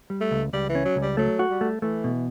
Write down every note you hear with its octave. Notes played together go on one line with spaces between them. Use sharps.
G3
A3
C#2
C#2 G3
E3
C#4
F#3
C#2
G3
F#3 A3
F#4
G3
A3
E3 A3
B2